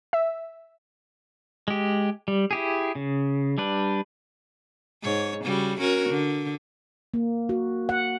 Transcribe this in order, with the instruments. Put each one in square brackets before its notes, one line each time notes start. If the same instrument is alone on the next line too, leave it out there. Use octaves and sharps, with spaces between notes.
[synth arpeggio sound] E5
[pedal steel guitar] G#3 G4
G3
E4 G4 G#4
C#3
G3 D4 B4
[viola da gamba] G#2 C#5
C#3 G3 F#4
C#4 F#4 A#4
D3
[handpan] A#3
F#4
F#5